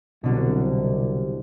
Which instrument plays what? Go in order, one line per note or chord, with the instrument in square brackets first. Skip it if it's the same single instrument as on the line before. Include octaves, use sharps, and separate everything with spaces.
[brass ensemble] C2 [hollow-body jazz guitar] B2 D3 F#3